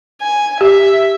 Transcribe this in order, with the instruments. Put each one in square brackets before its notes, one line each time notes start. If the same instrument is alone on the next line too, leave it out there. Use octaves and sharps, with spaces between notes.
[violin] G#5
[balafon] G4 [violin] E5